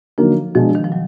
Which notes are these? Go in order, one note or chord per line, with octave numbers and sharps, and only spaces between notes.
D3 F3 F#3 A#3 D#4
B2 F3 G#3 D4
D#3
F3
F#3